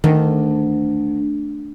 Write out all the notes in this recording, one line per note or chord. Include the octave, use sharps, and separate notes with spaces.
D2 D#3